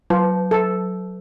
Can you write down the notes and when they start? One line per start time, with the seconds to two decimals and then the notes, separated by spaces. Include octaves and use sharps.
0.10 F#3 F4
0.51 A4